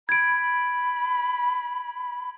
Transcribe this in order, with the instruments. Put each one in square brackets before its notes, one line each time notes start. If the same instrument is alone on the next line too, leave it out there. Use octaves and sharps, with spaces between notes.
[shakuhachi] B5 [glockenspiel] G#6 D7